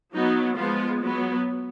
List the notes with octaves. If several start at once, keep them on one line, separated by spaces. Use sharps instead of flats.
F#3 B3 D#4
F3 G#3 B3 F4
F#3 B3